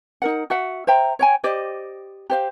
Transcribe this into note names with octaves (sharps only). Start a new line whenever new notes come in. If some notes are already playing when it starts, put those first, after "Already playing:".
D#4 A#4 F#5
F#4 E5 F#5
C5 E5 G5 A#5
C#5 G5 G#5
G4 C5 D5 D#5
G4 C5 F5